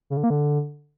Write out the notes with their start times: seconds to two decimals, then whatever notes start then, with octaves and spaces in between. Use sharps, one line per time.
0.10 C#3
0.17 D3
0.24 A#3
0.30 D3